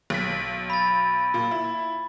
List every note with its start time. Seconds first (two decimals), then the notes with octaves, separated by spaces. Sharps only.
0.10 B1 B6
0.70 B5 A6
1.34 A#2
1.51 E4